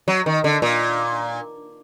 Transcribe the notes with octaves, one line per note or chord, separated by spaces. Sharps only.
F#3
D#3
D3
A#2